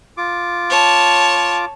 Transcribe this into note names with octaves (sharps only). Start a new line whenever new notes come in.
F4 D6
C#5 A5